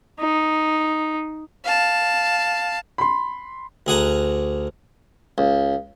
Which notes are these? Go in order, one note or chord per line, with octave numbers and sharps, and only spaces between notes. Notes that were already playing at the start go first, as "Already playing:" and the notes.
D#4
F5 A5
B5 C6
D2 G#4 F#5 A#5
C#2